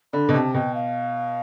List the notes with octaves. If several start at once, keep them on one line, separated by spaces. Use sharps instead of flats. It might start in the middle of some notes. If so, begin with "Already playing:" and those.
D3 B5
B2
C3 A5
B2 G5
F5